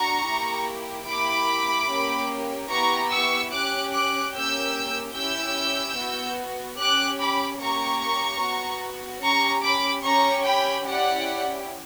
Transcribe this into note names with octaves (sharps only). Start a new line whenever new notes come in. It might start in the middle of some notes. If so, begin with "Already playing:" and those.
Already playing: D4 F#4 A#5 C#6
A#3 E4 G4
A#3 E4 G4 B5 D6
A#3 C#4 G4
B3 E4 G4 A#5 C#6
C#6 E6
C#4 G4 D6 F#6
D6 F#6
A#3 C#4 G4 E6 G6
C#4 E4 G4 E6 G6
B3 F#4
C#4 G4 D6 F#6
B5 D6
A#3 C#4 G4 A#5 C#6
B3 F#4
C#4 G4 A#5 C#6
B5 D6
C#4 G4 A#5 C#6
G5 B5
C#4 E4 G4 D5 F#5